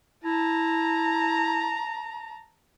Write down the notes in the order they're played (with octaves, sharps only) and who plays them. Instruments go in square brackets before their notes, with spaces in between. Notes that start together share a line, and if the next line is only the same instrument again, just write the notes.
[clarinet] E4 [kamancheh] A5 A#5